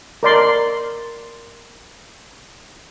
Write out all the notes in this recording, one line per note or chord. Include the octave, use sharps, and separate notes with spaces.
A#4 D5 C6